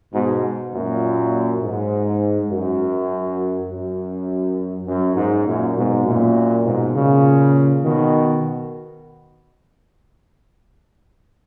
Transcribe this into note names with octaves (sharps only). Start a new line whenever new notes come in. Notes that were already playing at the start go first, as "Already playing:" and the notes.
G#2 B2
F#2 A#2
G#2
F#2
F#2
F#2
G#2
F#2 A#2
G#2 B2
F#2 A#2
G#2 B2
A#2 C#3
B2 D#3